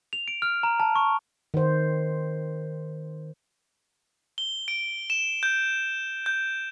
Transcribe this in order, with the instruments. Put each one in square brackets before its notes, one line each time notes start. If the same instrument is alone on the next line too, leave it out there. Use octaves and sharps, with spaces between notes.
[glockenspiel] F7
D7
F6
A#5
A5
C#6
[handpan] D#3 C5
[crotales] G7
D7
E7
G6
G6